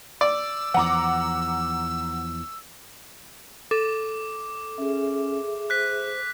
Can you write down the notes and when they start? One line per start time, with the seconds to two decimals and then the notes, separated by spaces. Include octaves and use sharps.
0.21 D5 E6
0.74 E2 F3 F#5 A#5 D6
3.71 A4 D6
4.78 C#4 G#4 E5
5.70 C5 F#6 B6